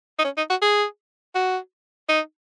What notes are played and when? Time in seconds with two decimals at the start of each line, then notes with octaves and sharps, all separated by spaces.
0.19 D#4
0.24 C#4
0.37 D#4
0.50 F#4
0.62 G#4
1.35 F#4
2.09 D#4